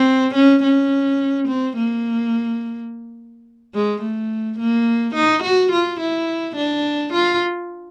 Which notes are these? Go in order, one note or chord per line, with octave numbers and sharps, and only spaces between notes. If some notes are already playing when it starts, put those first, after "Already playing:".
Already playing: C4
C#4
C#4
C4
A#3
G#3
A3
A#3
D#4
F#4
F4
E4
D4
F4